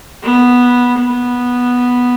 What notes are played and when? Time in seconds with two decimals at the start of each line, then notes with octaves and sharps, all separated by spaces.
0.23 B3
0.99 B3